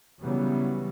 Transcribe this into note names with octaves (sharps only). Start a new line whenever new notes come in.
C#3 E3 F#3 G3 B3